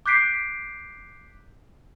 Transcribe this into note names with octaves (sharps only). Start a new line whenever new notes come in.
D6 F#6 G6 B6 C7 D7